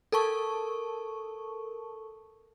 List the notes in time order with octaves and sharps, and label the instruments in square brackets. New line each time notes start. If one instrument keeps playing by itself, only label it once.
[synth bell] A4 A#4 A5 C#6